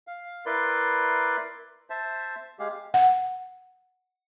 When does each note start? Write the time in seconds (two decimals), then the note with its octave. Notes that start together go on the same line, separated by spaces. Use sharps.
0.07 F5
0.46 E4 A#4 B4 D5 C6
1.90 C5 E5 A5
2.59 G#3 G4 G#4 F5
2.94 F#5